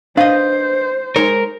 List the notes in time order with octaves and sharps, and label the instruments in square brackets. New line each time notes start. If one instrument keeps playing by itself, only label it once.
[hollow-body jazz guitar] D4 B4 D#5 [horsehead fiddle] C5 [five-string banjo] F5
[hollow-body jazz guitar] G#3 C5 C#5 [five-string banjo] D#4 [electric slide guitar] A#4